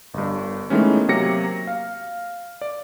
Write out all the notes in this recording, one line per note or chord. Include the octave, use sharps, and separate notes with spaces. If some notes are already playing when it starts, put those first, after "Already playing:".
G1 G2
D#3 E3 G#3 A3 B3 C#4
C3 F#3 A#3 G4 A#6 C#7
F5
D5